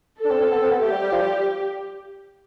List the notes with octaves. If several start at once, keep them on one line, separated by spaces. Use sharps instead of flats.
D4 A4
C4
C4
B3
C4
B3
A3 G4
G3
G3
F3
G3